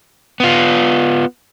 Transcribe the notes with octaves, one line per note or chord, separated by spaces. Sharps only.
B3 F4